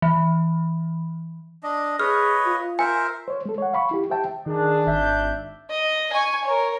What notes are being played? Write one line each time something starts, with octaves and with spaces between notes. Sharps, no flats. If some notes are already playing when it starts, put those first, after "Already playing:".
E3
D4 D#5
G#4 B4 C#5 D#5 F6
F4
A#4 C5 E5 G#5
C5 C#5
G#3 A4
C#5 F#5
F5 B5 C#6
E4 G4
G4 C5 E5 G5 A5
D#3 D4 G#4
G#1 E5 G6
D#5
G#5 C#6
A#4 C#5